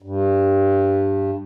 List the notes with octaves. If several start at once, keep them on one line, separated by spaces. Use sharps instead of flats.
G2